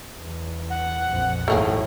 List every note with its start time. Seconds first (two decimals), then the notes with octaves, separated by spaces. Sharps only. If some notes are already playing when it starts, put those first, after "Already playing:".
0.15 E2
0.70 F#5
1.09 A#1 F2
1.48 G#1 D#2 A2 A3 A#3 G#4